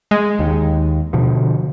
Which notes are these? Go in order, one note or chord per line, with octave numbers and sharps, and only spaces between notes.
G#3
D#2 D#3
B2 D3 F3